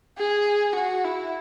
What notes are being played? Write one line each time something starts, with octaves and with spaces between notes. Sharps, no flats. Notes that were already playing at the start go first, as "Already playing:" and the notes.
G#4
F#4
E4